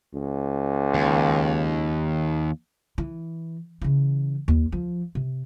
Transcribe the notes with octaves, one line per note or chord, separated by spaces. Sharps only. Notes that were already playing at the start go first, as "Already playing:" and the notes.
C#2
D#2
E3
C#3 E3
D#2
F3
C3